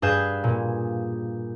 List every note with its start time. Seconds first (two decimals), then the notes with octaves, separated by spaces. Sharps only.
0.02 G2 G#4 B4 F5 G6 E7
0.44 A#2